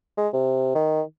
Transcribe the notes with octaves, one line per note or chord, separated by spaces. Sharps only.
G#3
C3
D#3